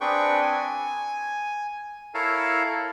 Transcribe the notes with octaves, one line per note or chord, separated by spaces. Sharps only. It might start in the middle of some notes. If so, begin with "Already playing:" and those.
C4 D4 G#4 B4 G5 C#6
G#5
E4 A4 A#4 C#5 F5